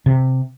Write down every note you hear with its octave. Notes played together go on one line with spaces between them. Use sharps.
C3